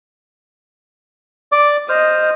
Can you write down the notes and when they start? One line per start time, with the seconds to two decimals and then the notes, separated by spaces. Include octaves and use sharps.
1.52 D5 D6
1.89 C5 D#5 F6